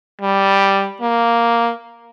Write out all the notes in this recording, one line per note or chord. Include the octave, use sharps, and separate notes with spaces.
G3
A#3